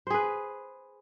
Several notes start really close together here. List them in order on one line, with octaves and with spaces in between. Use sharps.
C5 G#4 B4